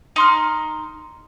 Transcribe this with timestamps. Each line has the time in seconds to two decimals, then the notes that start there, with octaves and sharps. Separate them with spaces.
0.16 D#4 C6 F6